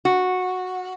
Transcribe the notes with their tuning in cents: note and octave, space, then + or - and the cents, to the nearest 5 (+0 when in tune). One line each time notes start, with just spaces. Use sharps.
F#4 -10